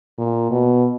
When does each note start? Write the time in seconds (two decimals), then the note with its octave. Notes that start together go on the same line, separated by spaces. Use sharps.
0.18 A#2
0.51 B2